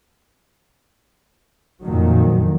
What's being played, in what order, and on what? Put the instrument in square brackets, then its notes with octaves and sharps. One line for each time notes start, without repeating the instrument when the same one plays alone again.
[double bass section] F2 A#2 D#3 F#3